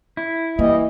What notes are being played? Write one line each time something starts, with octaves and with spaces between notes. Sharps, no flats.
E4
E3 G3 A#3 D#5